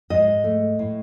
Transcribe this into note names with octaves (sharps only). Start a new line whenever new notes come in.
G#2 D#5
A3
A2